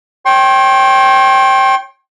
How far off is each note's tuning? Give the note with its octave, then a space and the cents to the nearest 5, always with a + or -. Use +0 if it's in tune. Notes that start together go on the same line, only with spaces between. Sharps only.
C#5 +0 G5 -5 C6 +40